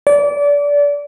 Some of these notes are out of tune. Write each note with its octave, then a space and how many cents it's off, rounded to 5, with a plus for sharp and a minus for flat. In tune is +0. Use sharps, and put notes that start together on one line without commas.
D5 -25